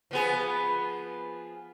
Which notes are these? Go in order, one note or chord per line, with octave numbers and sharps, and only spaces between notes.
F3 B3 G#4